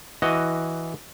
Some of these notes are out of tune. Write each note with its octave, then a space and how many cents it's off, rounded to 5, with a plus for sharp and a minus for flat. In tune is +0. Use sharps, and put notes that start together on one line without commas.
E3 +0 F#4 +0 D#5 +0